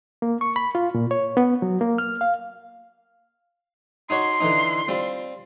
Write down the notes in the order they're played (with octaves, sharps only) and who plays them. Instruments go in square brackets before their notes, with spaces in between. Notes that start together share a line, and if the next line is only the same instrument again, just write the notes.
[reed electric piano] A#3
C#6
B5
F4
A#2
C#5
B3
F#3
A#3
F6
F5
[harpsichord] D#4 F#4 C#5 [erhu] C6
[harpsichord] D3 E3 D#4
G3 C4 F4